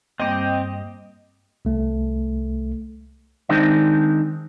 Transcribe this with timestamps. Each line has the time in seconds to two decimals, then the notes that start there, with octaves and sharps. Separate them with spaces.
0.20 G2 G3 A#3 C4 G4 D#5
1.65 C2 A3
3.49 D#3 G#3 C4 D4 D#4